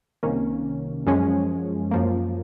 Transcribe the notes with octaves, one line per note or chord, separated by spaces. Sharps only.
C2 C3 D#3 A#3 C#4
F#2 F3 G#3 C#4
F#2 F3 A#3